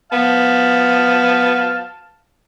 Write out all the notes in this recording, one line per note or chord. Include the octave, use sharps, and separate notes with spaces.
B3 F5 A5